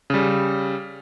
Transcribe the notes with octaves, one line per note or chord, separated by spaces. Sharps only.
C#3 G3